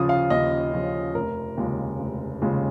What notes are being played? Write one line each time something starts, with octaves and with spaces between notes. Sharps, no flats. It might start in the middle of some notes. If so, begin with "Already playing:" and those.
Already playing: D#2 C#3 F3 C#4 F4 D#6
F5
D#2 D#5
C#3 F3 C#4 F4
F1 A#4
D#2 C#3 G#3 F4
F1
D#2 C#3 G#3 F4